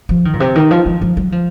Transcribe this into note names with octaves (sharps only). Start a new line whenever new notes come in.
F3
D#3
A#2
C3
D#3
F3
F3
F3
F#3
F3